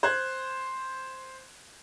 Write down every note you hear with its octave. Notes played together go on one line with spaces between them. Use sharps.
C5 F#6 G#6